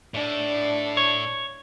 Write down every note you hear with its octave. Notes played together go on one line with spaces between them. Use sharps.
A2 D4
C#5